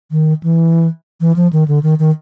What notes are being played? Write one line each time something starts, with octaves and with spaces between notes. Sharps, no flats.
D#3
E3
E3
F3
D#3
D3
D#3
D#3